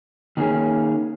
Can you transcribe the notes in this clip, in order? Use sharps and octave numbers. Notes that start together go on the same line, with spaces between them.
D#3 A#3 C#4 G#4